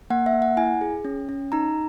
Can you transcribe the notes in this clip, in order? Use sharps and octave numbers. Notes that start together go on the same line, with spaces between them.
A#3 F#5
E5
A#3
F#5
E4 G#5
G#4
C#4
C#4
D#4 A#5